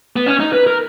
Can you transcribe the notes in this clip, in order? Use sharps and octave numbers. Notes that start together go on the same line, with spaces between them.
B3
C#4
D#4
B4
A#4